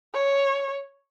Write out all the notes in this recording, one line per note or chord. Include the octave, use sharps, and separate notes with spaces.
C#5